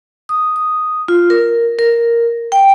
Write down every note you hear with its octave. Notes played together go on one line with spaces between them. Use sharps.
D#6
D#6
F4
A#4
A#4
G5